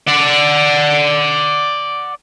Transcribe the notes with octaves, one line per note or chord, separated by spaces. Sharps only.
D5 F#5